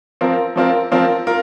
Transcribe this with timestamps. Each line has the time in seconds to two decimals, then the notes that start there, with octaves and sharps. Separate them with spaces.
0.21 F3 C4 F4 A#4
0.56 F3 C4 F4 A#4
0.92 F3 C4 F4 A#4
1.27 F4 A#4